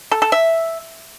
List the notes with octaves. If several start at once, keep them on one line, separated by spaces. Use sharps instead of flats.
A4
A4
E5